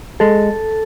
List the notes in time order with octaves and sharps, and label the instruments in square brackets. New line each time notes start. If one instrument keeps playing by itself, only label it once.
[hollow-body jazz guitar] G#3 [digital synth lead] A4